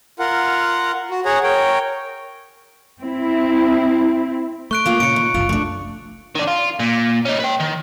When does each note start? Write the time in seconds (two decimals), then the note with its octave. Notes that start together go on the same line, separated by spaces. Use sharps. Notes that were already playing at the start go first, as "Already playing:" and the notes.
0.19 F4 A#4 F#5
1.10 F#4
1.25 G#4 C#5 F#5 A#5
1.43 A#4 C#5 G5
3.03 C4 E4
4.71 A3 C#6 F#6 D7
4.86 A#3 F4 F5
5.00 A#2 C#3 C#7 D7
5.16 D#3
5.34 F#1 C2 F4
5.49 A3 D4
6.35 D#3 D4
6.47 F4
6.79 A#2
7.25 C#4 D#4
7.40 B4 G5
7.60 D#3